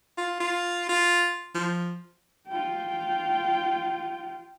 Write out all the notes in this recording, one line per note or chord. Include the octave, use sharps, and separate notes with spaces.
F4
F4
F4
F3
F4 G5